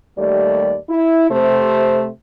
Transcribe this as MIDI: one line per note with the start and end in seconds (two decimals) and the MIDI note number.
0.18 0.76 39
0.18 0.76 55
0.18 0.76 57
0.18 0.76 74
0.90 1.28 64
1.31 2.09 48
1.31 2.09 57
1.31 2.09 72